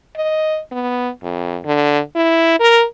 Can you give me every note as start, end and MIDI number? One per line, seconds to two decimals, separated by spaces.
0.16 0.60 75
0.72 1.09 59
1.23 1.59 41
1.65 2.00 50
2.16 2.55 64
2.60 2.85 70